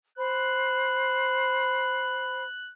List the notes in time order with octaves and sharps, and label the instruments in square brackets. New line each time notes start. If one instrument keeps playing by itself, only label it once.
[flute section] C5 B5 [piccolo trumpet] F#6